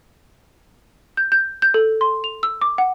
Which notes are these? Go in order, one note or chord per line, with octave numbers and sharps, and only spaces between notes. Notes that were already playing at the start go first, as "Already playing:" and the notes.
G6
G6
G6
A4
C6
F7
E6
D6
F#5